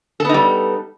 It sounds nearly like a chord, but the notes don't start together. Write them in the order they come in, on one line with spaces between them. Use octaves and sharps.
A4 B3 D#4 G3